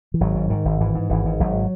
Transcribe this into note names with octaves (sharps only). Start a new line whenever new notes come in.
E3
G#1 F#3
G#2
G#2 D#3
G#1
G#2 E3
G#2
G#1 E3
G#2
G#1 F#3